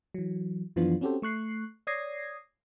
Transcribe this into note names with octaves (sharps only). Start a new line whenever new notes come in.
E3 F#3
F#2 E3 F3 B3 D4 F4
C4 C#4 F#4 G4 A4 C5
A3 C#6 F#6 C7
C#5 D5 D#6 G#6 A#6 C7